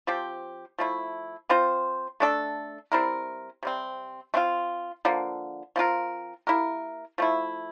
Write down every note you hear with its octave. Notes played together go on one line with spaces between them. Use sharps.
F3 C4 G4
F3 A3 E4
F3 C4 F4 C5
A3 D4 A4
G3 C4 E4 A#4
C3 G3 C4
A3 C4 F4
D3 F3 A#3
F3 C4 F4 A#4
A#3 E4 G4 A#4
F3 A3 E4